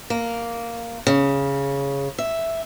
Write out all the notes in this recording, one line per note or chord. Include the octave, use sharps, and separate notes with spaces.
A#3
C#3
E5